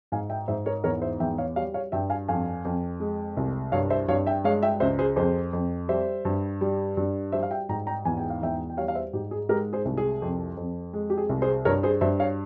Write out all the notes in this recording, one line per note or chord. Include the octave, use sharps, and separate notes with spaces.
G#2 F5 G#5
E5 G5
G#2 C5 E5
A#4 C#5
E2 A#4 C#5
C5 E5
E2 E5 G5
C#5 F5
G3 C#5 F5
C#5 F5
G2 E5 G5
F5 G#5
F2 F5 G#5
F2
G#3
C2
G2 C#5 F5
C5 E5
G2 C#5 F5
E5 G5
G#3 C#5 F5
E5 G5
C#2 C5 E5
G#4 C5
F2 G#4 C5
F2
G3 C5 E5
G2
G3
G2
G3 C5 E5
F5
E5 G5
G#2 G5 A#5
G5 A#5
E2 G#5
G5
F5
E2 E5 G5
G5
G3 C#5 F5
F5
C5 E5
G#2 G4
G#4
G#3 G4 A#4
G#4 C5
C2
G#4
F2
F2
G#3
G4
G#4
C2
G#4 C5
G2 A#4 C#5
G#4 C5
G2 C5 E5
C#5 F5